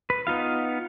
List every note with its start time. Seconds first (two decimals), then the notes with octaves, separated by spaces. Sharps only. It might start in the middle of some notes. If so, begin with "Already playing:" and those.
0.10 B4
0.27 B3 D#4 F4 F5